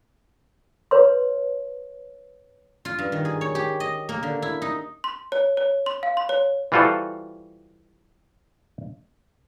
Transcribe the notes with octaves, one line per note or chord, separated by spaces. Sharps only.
B4 C#5 C6
F4
G2
D#3
G#4
C#5
G4
D#5
A#3
D3
E4
D#4
C6
C#5
C#5
C6
F5
C6
C#5
E3 G3 F4 F#4 A4 C5